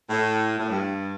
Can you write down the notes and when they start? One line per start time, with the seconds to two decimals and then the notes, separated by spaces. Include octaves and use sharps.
0.10 A2
0.58 A2
0.68 G2